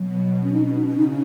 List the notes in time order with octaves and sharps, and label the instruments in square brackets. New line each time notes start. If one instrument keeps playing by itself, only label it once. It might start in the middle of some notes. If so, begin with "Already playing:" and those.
Already playing: [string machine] B2 [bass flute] F#3
[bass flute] C#4
D#4
C#4
D#4
C#4
[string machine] C#3 [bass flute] D#4
[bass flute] C#4